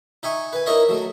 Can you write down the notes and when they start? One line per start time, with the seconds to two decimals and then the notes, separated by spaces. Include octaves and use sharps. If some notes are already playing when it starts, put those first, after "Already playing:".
0.23 D#4 E5 G#5 C#6
0.53 B4 G#5
0.66 D#4 E4 A#4 C#5 D#5 E5
0.89 F#3 A3